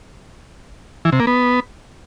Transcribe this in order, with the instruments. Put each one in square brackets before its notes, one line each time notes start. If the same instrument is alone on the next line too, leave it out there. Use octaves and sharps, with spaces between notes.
[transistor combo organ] E3
C3
A#3
B3